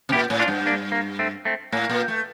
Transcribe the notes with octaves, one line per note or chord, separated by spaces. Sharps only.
C3
A#2 E4 G4
A2
D4 F4
G2
A#3 D4
A#3
A3 C4
A3 C4
A2 A#3
A#2
A3